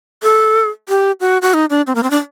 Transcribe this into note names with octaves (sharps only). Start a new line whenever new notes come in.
A4
G4
F#4
F#4
D#4
D4
C4
A#3
C4
D4